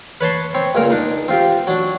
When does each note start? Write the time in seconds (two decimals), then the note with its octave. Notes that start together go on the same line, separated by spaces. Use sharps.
0.21 B4 C#5 A5 C6
0.54 C4 C#5
0.75 C#2 A#2 A#4
0.90 D4 D#4
1.28 C4 F4 G4
1.67 F#3 D4